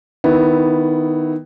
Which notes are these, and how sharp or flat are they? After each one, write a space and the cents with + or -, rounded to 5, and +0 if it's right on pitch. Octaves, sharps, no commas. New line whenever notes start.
D#3 +0 B3 +5 E4 -15